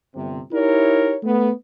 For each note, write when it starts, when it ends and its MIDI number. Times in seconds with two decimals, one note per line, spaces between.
0.14 0.38 31
0.14 0.38 48
0.52 1.14 63
0.52 1.14 64
0.52 1.14 67
0.52 1.14 70
0.52 1.14 73
1.24 1.49 57
1.24 1.49 59